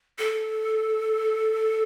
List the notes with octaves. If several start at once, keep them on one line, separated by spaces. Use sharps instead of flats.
A4